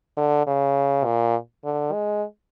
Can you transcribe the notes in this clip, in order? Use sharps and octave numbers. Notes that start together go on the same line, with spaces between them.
D3
C#3
A#2
D3
G#3